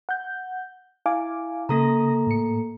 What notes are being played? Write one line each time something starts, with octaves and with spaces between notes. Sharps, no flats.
F#5 G6
E4 F5 G#5 D6
C#3 A#3 A4 A#5 D#6 A#6
A2 C#7